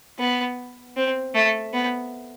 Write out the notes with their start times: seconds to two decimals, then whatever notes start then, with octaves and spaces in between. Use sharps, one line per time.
0.19 B3
0.96 C4
1.35 A3
1.73 B3